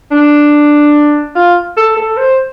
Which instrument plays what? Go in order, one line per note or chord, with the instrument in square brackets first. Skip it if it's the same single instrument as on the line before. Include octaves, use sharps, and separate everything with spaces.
[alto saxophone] D4
F4
A4
A4
C5